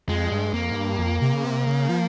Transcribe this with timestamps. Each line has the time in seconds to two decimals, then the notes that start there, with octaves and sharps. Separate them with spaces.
0.08 F2 G#3
0.32 G2
0.53 F2 A#3
0.72 G#2
0.76 G2
0.99 F2
1.22 C3
1.33 C#3
1.44 C3
1.67 C#3
1.89 F3